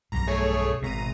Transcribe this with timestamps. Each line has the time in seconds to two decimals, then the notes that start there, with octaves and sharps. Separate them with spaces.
0.12 B1 G2 A#5 A#6
0.27 A3 G#4 C#5
0.82 G#1 B2 A#5 D#7